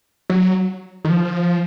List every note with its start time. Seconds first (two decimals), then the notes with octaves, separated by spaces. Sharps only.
0.30 F#3
1.05 D#3
1.09 F3